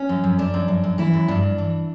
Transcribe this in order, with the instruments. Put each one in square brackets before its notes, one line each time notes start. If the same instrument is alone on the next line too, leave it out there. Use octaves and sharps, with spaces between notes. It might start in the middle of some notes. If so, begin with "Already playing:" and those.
Already playing: [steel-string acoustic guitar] C#4
F#2
F#2
F#2 D4
F#2
F#2
F#2
E3 E4
F#2
G2 D4
G2
E3